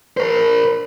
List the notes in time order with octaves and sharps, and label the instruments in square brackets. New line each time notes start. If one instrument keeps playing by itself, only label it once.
[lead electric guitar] A#4 C5